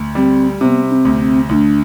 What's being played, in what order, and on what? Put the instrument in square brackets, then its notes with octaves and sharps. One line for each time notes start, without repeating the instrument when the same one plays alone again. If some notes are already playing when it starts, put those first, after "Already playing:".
Already playing: [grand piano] D2
[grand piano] G3 [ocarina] C4
[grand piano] C3 [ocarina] B3 C4
[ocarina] D4
C4
[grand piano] D2
[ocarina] C4
[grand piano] D2 [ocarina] E4
[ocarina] D4